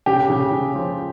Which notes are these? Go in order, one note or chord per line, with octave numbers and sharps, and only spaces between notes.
C#3 G4
C#3
C#3
F3